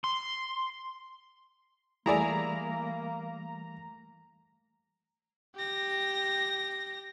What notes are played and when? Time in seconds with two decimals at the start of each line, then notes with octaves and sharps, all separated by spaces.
0.04 C6
2.06 E3 G3 A3 A#3 E4 G#4 D5 A#5
5.56 G4 A#6